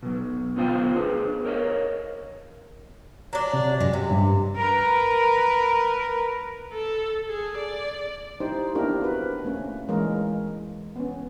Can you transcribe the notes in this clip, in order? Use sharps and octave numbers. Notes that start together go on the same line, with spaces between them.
B2 F#3
D3 B3 F4 C5 F5 G5
D4 G#4 B4
A#4 C#5 D#5 F5
F#3 D4
C3
F#2 G#3
C3
G2
A#4 B4
A4
G#4
D5
D#4 E4 G4 C5
A#3 B3 D4 E4 G4 A#4
C4 F#4 B4
A3 A#3 C#4
E3 G#3 A#3 A#4 C#5
B3 C#4